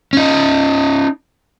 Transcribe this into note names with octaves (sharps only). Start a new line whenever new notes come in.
C#4 D#4